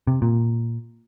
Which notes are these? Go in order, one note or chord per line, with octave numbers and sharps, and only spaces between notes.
C3
A#2